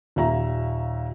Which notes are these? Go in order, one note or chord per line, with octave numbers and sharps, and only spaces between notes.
D#2 A#2 E5 A#5